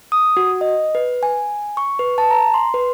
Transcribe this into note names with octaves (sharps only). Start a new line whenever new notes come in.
D#6
F#4
D#5
B4
G#5
C#6
B4
A5
A#5
C6
B4